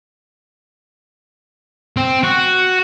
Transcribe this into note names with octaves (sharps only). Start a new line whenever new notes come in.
C4
F#4